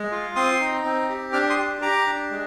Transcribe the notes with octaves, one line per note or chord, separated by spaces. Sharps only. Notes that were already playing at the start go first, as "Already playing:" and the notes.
Already playing: G#3
F4
C4 C6 D#6
D#4
C4
G4
D4 D6 F6
C6 D#6
G4
G4 A#5 D6
D4
G#3